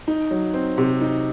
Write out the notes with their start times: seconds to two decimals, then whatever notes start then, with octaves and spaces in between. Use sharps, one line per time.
0.08 D#4
0.31 F#3
0.54 C4
0.78 C3
1.01 D#4